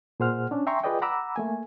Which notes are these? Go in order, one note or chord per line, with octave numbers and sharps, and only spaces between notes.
A#2 G#4 C5 F#5 F6
C#4 D4
E5 G5 G#5 A#5 C6 C#6
F4 G#4 B4 D5 D#5 G5
F#5 A#5 B5 D6 E6
A3 A#3 G#5